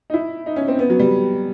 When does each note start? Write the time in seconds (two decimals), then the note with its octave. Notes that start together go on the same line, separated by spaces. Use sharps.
0.10 D#4
0.14 E4
0.46 D#4
0.56 C#4
0.68 C4
0.79 B3
0.90 F#3
0.99 G3